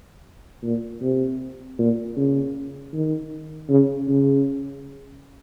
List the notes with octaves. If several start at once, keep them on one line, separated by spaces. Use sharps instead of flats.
A#2
C3
A#2
C#3
D#3
C#3
C#3